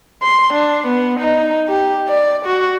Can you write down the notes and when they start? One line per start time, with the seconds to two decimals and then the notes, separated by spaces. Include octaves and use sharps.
0.22 C6
0.53 D4
0.87 B3
1.20 D#4
1.68 G4
2.08 D5
2.46 F#4